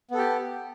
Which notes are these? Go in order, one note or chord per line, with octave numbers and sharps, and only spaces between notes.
B3 G4 A4